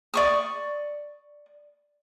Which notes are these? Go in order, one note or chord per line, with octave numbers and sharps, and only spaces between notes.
D5 C#6 D#6